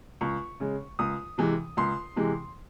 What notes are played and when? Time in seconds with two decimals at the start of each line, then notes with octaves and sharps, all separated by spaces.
0.21 C#2 C#6
0.60 C#3 G#3
0.99 C#2 D#6
1.38 C3 E3 G#3
1.77 C#2 C6
2.16 C3 E3 G#3